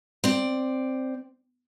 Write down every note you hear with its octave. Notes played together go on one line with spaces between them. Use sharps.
C4 D5